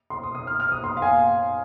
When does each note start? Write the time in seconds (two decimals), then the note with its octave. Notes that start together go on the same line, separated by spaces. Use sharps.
0.10 C6
0.23 D#6
0.35 D#6
0.47 F6
0.60 F6
0.72 D#6
0.84 C6
0.97 F5
1.02 G#5